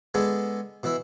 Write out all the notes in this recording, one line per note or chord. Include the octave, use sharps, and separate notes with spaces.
G#3 B3 D4 G#4 A4
B2 E3 E4 E5